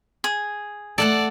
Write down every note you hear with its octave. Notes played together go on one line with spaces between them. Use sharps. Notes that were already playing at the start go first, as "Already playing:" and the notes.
G#4
A3 A4 D5 F#5 A5